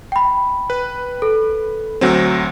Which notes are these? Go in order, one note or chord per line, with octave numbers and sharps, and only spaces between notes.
G5 B5
B4
A4
D2 F#3 C4